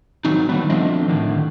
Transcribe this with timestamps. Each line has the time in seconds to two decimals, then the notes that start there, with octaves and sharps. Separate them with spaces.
0.25 D#3 F#3 C4 D#4
0.49 D3 D#3 F#3 G3 A#3 B3
0.70 F3 A3 C4 D4 D#5
1.08 A2 D3 D#3